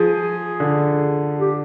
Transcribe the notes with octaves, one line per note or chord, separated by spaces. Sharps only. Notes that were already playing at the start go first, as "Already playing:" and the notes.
Already playing: F3 G#4
D3
G4